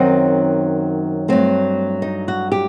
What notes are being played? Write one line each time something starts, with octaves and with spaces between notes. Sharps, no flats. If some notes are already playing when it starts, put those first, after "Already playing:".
Already playing: F#2 D#3 F#3 C4 D#4
G2 F#3 A3 C4
D#4
F#4
G4